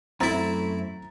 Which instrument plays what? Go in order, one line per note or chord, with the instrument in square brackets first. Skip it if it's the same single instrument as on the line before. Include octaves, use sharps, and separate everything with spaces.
[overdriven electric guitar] F#2 [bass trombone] A3 [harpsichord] C4 E4 [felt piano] A#5 A6